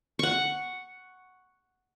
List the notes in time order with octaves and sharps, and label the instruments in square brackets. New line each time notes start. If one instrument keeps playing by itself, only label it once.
[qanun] F#5 C#6